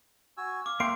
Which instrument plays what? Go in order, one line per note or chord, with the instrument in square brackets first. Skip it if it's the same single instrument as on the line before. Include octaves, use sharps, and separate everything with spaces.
[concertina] F#4 G#5 E6
[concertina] F5 [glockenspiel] D6
[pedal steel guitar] A#3 F5 C6 [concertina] E5 G5 [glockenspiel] D7